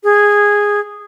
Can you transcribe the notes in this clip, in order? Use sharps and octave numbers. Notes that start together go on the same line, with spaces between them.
G#4